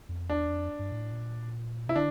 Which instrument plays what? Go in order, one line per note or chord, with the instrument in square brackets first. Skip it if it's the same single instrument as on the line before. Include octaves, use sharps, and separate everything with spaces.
[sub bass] F2
[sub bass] E2 [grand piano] D4
[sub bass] F2
G2
A2
A#2
[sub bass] C3 [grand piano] E4
[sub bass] D3 [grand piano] D4